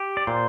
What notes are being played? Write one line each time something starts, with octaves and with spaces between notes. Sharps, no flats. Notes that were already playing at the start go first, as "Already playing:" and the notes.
Already playing: G4
D5
A#2 C5